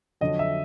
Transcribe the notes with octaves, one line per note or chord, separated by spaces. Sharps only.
F2 D3 F#3 D#5
E5